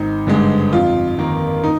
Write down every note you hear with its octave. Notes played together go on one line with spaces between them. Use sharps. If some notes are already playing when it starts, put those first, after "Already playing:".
Already playing: G#1 D#4
G2 D3 G#3
F2 F4
D#3 A#3
D#4